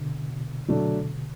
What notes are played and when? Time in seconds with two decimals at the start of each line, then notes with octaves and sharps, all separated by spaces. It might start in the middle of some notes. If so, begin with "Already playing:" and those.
Already playing: B2 D3
0.29 B2
0.68 B2 D3 F#3 A3 D4